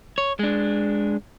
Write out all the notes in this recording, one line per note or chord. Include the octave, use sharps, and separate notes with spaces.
C#5
G#3 D4